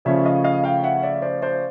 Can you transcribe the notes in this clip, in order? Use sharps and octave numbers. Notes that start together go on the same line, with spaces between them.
C#3 F3 A3 C#4 D5 E5
D#5 F5
D#5 F5
F5 G5
E5 F#5
D5 E5
C5 D5
C5 D5